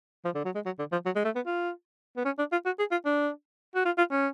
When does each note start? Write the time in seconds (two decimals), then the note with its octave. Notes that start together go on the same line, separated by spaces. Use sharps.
0.25 F3
0.35 D3
0.45 F#3
0.55 G#3
0.65 F#3
0.79 D3
0.92 F3
1.05 F#3
1.16 G#3
1.25 A3
1.35 B3
1.46 F4
2.17 B3
2.25 C#4
2.39 D4
2.52 F4
2.66 F#4
2.79 G#4
2.91 F4
3.05 D4
3.76 F#4
3.86 F4
3.98 F4
4.11 C#4